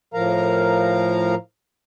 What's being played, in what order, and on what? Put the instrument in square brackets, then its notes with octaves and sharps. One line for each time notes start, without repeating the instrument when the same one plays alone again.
[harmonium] A2 F3 A#4 F5 A#5